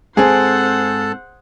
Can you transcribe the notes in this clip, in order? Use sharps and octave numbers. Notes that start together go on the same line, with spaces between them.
G#2 C4 G#4 A4 C5 F#5 A5